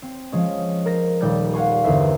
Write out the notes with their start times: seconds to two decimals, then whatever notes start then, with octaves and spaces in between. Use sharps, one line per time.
0.02 C4
0.32 F3 G#3 C#4
0.86 A#4 C5 A#6
1.21 D#1 G3 G6
1.54 F5 F#5 G#5 C6 C#6
1.84 G1 E2 A#4 C5 E5